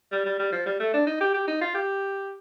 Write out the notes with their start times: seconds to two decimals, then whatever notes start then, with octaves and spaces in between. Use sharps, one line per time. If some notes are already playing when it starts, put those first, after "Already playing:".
0.12 G3
0.25 G3
0.39 G3
0.52 F3
0.66 G3
0.80 A3
0.93 D4
1.06 D#4
1.20 G4
1.34 G4
1.48 D#4
1.61 F4
1.74 G4